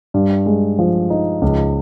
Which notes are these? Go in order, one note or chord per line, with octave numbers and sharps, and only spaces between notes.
G2
G#3
F3
D#4
C#2